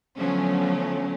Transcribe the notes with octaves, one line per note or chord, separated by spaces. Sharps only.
D3 F3 F#3 A3 B3 C#4